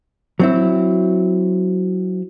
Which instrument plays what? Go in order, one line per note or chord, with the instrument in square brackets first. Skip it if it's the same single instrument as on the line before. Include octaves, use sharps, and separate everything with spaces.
[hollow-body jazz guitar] F#3 C4 E4